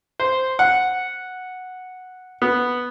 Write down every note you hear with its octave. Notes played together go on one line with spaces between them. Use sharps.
C5
F#5
B3